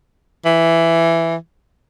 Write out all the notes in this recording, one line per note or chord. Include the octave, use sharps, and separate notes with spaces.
E3